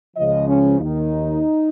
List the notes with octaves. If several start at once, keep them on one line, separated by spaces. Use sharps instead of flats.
C#2 C#3 F3 D#5
C#4
D#2 D#3 D#4